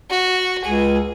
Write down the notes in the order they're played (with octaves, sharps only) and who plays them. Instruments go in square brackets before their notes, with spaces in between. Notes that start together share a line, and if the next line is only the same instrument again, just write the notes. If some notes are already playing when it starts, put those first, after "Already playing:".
[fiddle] F#4
[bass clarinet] C#2 [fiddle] G#4